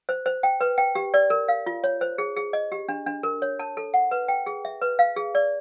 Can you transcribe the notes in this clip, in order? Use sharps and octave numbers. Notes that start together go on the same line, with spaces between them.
C5
C5
G5
B4
G5
G4
D5
A#4
F5
F4
C#5
C5
G#4
G#4
D#5
G4
D4
D4
A#4
C#5
A5
A4
F#5
B4
G5
G#4
E5
B4
F5
G#4
D5